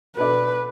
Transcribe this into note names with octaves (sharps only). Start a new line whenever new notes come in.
B2 B3 D4 A4 B4 D5